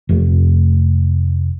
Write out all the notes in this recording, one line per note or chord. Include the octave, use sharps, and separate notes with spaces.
F1